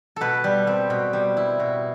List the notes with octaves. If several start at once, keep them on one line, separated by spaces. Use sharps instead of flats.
B2 A4 B4
G3
C4
B2
G3
E4
B2